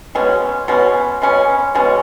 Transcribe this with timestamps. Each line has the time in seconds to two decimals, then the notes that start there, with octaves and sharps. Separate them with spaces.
0.15 B2 G#3 C#4
0.68 B2 G#3 C#4
1.22 B2 G#3 C#4
1.75 B2 G#3 C#4